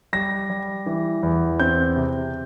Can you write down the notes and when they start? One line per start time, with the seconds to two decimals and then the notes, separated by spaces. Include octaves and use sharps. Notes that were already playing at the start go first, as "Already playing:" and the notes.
0.13 G3 A#6
0.50 G3
0.86 E3
1.23 E2
1.60 C4 G6
1.96 C3